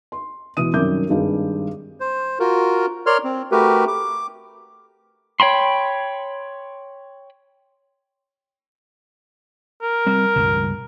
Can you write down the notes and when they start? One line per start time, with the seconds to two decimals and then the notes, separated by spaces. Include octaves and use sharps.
0.12 C6
0.57 B2 E3 D#6 D#7
0.73 C2 F#2 D#3 E5 D6 G6
1.10 G#1 G2 D#4 G#4
2.00 C5
2.39 F4 F#4 A#4
3.06 A#4 C#5 D5 C6 F6
3.24 C4
3.52 A3 F#4 G4 A#4 B4
3.88 D6
5.40 C#5 G5 B5 C6
9.82 A#4
10.07 G3 C4
10.36 C#2 G2 B2